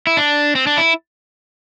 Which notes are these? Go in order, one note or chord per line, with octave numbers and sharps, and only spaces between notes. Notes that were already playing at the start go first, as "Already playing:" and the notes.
E4
D4
C4
D4
E4